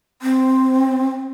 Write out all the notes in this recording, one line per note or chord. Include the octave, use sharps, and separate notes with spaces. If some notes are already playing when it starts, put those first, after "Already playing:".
C4